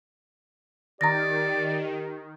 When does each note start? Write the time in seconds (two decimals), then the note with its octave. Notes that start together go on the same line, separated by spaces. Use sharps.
1.01 D#3 G4 D5 A#5 A#6